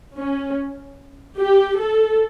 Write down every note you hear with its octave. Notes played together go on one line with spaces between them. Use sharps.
C#4
G4
A4